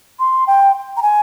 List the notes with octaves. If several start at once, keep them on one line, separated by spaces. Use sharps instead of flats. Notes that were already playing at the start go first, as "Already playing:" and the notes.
C6
G5
A#5
G#5